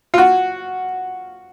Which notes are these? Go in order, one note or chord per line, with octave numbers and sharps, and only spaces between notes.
F4
F#4